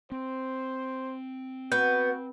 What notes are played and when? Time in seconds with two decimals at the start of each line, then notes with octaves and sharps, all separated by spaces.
0.12 C4 C5
1.72 B3 F#4 G6